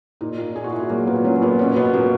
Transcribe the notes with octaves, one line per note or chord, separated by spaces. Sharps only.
A#2 D#4
A#2
A#2 G#4
F#4
A#2 E4
F#4
F#3 A#3
A#2 B3
F#3 C#4
A#2 B3
B2 C#4
B2 B3
B2 A#3